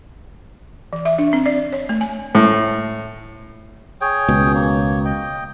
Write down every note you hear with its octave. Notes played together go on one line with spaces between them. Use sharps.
E3
E5
D4
C4
D5
C#5
A3
G#5
A2
G#4 C#5 G5
C#2 B2
A#3 C#5
D#5 G5